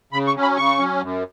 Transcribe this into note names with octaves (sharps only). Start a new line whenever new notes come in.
C#3 B5
C#6
F#3 C#4
B5
C#3 C#6
F#3 C#4
F#2